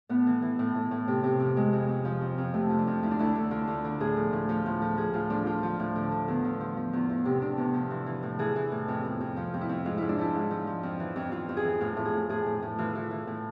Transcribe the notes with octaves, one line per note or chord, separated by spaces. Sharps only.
A2 B3
E3
E3
A2
A2
A2
C3
C3
F2
F2 G#3
F2
F2
F3
F2
F2
C3 A3
F3
D4
F2
D2 E4
D4
D2 E4
D2
D3 F4
D2
D3
A2 G#4
F3
A2
F3 F4
A2
F3
F3 G#4
A2 F4
F3 D4
F3 F4
F3
A2
D3
D3
E2
F3
F3
F3
E2
E2
C3
C3 D4
E2
F3
E3
E3
A2
E3 G#4
E3
A2
F2
F2
F2
F3 F4
F2
E4
F2
G#2 F4
G#2 E4
D4
F3 E4
G#2
F3
F3
F2
E3
F2
F2 F4
F2
G#4
E3
A2 F4
A2
G#4
A2
A2 G#4
A2
A2
E3 F4
E3
E3
A2